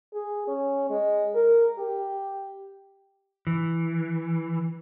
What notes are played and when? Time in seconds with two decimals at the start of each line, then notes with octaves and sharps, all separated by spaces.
0.14 G#4
0.48 C#4
0.90 G#3
1.35 A#4
1.79 G4
3.47 E3